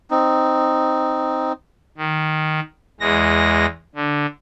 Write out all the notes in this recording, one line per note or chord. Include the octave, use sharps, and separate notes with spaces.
C4 D#4
D#3
E2 G#3 A#6
D3